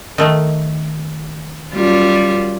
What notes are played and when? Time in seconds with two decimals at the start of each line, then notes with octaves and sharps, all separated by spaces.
0.18 D#3 A3
1.73 F#2 G3 F4